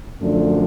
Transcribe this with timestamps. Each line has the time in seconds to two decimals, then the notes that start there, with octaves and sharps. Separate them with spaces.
0.21 F#2 D3 F3 A3 D4